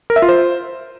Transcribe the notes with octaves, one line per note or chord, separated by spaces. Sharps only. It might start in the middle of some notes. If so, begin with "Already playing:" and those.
A#4
E5
F4
C5